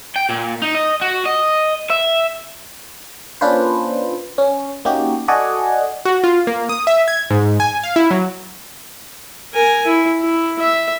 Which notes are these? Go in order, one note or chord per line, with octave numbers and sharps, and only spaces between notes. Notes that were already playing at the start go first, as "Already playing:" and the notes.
G5
A#2
D#4
D#5
F#4
D#5
E5
A#3 C#4 D4 F4 B4 C5
C#4
A#3 C#4 D#4 F#4 G4
F#4 A4 D5 D#5 F#5 G#5
F#4
F4
A#3
D#6
E5
G#6
G#2
G#5
F5
E4
F#3
A#4 G#5
E4
E4
E5